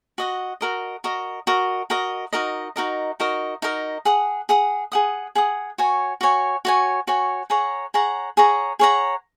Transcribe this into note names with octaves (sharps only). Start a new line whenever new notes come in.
F#4 D#5 F#5
F#4 A#4 D#5
F#4 A#4 D#5
F#4 A#4 D#5
F#4 A#4 D#5
D#4 F#4 A#4 D#5
D#4 F#4 A#4 D#5
D#4 F#4 A#4 D#5
D#4 F#4 A#4 D#5
G#4 F#5 D#6
G#4 F#5 D#6
G#4 F#5 D#6
G#4 F#5 D#6
F#4 C#5 G#5
F#4 C#5 G#5
F#4 C#5 G#5
F#4 C#5 G#5
G#4 C#5 F#5 A#5
G#4 C#5 F#5 A#5
G#4 C#5 F#5 A#5
G#4 C#5 F#5 A#5